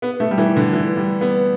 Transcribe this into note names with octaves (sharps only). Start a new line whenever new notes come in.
B3
A3
G3
E3
D3
E3
G3
B3